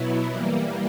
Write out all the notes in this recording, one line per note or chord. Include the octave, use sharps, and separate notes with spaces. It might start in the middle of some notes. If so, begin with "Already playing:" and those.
Already playing: B2 F#3 B3 E4
E3 G3 A#3